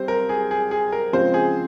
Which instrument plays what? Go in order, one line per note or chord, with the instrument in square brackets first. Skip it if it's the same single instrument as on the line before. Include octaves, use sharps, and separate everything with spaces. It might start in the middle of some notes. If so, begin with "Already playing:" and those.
Already playing: [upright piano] G3 C4 G4 [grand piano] C5
[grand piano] A#4
G#4
G#4
G#4
A#4
[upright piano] C#3 F3 G#3 C4 F4 [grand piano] C5
[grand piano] G#4